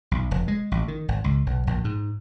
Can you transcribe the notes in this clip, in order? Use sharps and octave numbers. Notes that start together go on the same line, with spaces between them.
B1
F1
G#3
A1
D#3
G#1
C#2
B1
A#1
G#2